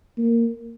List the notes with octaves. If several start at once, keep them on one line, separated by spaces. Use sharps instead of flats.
A#3